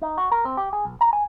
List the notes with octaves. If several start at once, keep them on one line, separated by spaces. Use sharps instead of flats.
D#4
F#4
A#4
C4
G4
G#4
B1
A#5
G#5